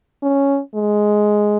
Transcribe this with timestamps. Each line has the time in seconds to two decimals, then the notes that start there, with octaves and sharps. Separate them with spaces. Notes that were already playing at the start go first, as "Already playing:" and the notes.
0.23 C#4
0.75 G#3